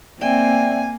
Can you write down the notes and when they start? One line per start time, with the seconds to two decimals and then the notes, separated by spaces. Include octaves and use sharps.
0.21 A#3 C4 D5 E5 G5 G#5